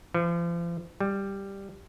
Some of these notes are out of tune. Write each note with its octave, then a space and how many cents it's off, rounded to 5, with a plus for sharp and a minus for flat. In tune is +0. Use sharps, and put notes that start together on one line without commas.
F3 -40
G3 +5